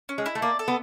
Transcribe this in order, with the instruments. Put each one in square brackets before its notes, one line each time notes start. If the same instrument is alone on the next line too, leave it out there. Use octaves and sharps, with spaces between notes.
[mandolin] C#4
[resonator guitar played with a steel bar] G#3
[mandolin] E4
[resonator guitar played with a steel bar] A3
[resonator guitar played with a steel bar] A#3 [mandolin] D5
[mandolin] A4
[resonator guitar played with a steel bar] B3